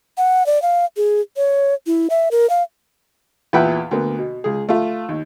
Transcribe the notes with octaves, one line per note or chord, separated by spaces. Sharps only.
F#5
D5
F5
G#4
C#5
E4
E5
A#4
F5
E2 A#2 B4 E5 F#5 G5
D2 A#3 B3
B2
C#2 G#4
A3 F4
D#2